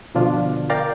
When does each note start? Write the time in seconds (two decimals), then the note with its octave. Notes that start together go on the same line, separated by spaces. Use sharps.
0.15 B2 D3 F3 D4 F4
0.70 A#4 D5 F5 G5 A#5 A6